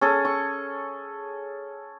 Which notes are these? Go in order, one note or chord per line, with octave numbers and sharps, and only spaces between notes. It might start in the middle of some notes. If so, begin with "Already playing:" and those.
C#4 G#4 A4
C#6